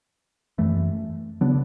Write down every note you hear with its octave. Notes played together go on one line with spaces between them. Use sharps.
F#2 E3 A3
C#3 F#3 B3 D4